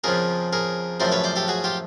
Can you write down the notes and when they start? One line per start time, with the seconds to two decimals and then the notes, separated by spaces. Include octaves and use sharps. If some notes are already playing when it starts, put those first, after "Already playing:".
0.04 F2 C#3 F3 G#4 A#4
0.53 G#4 A#4
1.00 F#2 C#3 F3 A3 A#4 C5
1.12 B4 C#5
1.24 C5 D5
1.36 G4 A4
1.48 F#4 G#4
1.64 F4 G4